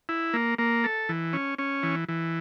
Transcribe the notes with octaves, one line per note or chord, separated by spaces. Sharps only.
E4
A#3
A#3
A4
E3
C#4
C#4
E3
E3